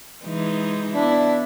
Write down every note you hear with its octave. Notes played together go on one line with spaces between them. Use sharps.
E3 G#3 D#4
B3 D4 E4